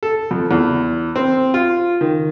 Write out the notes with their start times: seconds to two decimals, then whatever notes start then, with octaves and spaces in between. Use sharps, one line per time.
0.03 A4
0.31 F2
0.51 E2
1.16 C4
1.54 F4
2.01 D#3